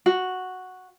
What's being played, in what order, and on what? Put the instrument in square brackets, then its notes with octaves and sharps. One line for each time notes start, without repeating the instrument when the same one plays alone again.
[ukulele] F#4